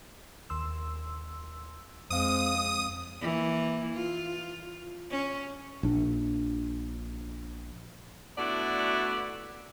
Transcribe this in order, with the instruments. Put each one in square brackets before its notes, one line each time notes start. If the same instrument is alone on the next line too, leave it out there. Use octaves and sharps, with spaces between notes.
[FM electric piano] D#2 C6 E6
[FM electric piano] F2 F5 [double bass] G#3 C4 [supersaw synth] D#6
[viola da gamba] E3 A#3
F4
C#4
[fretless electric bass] A#1 D4
[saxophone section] A3 B3 D4 E4 F#4 D5